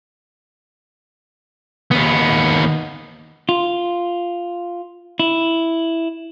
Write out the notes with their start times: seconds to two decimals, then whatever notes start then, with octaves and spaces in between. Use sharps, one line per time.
1.91 D#2 B3
3.49 F4
5.20 E4